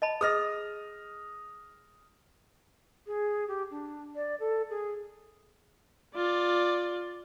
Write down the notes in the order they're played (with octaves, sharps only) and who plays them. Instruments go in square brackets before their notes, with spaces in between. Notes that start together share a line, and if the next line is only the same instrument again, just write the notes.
[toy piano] D#5 A5 B5
[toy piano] G#4 D#5 [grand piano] D#6 F6 A#6
[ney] G#4
G4
D4
D5
A4
G#4
[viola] F4 D5